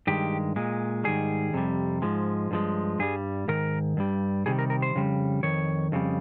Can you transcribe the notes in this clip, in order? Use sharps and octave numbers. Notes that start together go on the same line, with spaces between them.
G2 D#3 G#3 G4
A#2 G#3
G#2 D#3 G3 G#4
F2 C3 G3
G#2 F3 G#3
G2 F3 G#3
G2 G3 G#4
G#2 D#3 A#4
G2 G3
C3 D#3 G3 G#4
A#4
A#4
C5
F2 C#3 G3
F2 D#3 C#5
F2 C#3 G3